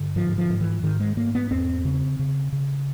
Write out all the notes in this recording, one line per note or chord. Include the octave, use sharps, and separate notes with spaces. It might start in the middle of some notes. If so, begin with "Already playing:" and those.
Already playing: G2 D3
G#2 F3
F3
G#2
E3
G#2 D#3
G#3
G#2 A#3
B3
E2 C4
C#3
C#3
C#3